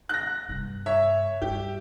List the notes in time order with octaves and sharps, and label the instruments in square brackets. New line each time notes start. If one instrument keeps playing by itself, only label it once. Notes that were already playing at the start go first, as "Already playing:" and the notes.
[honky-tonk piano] F#6 A#6
[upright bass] G2 C3
[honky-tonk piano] C#5 [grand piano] E5
[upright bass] G2 [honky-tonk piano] G4